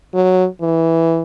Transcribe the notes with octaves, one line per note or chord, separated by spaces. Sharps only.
F#3
E3